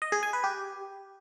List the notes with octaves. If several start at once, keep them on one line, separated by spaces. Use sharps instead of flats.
D#5
G#4
G#5
B4
G4